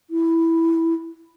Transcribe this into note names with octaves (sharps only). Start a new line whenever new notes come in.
E4